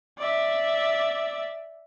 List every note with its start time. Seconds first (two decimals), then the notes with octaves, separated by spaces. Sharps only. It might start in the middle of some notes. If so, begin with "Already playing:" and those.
0.18 D5 E5